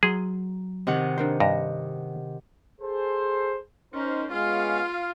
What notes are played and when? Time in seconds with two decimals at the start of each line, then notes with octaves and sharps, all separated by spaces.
0.03 F#3 G#4 C6
0.87 C3 D#3 F#5
1.18 D4 A#4 C5
1.40 G2 D#5
2.81 G#4 A4 C5
3.94 C#4 D#4 A#4 C5
4.32 G#3 B3 C#4 F4 F5